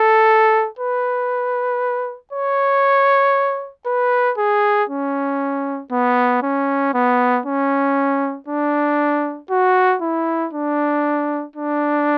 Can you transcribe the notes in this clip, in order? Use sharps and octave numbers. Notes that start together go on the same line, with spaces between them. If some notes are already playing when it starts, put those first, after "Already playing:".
Already playing: A4
B4
C#5
B4
G#4
C#4
B3
C#4
B3
C#4
D4
F#4
E4
D4
D4